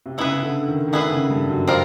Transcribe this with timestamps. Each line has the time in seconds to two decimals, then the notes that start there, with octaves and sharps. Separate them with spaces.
0.06 C3
0.18 C#3 B3 E4 G#4 B4
0.43 D3
0.68 D#3
0.88 D#3
0.93 D3 B3 E4 G#4 B4
1.11 C#3
1.30 G2
1.49 F#2
1.68 C4 F4 A#4